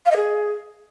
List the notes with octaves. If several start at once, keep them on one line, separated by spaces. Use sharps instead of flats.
F5
D#5
G#4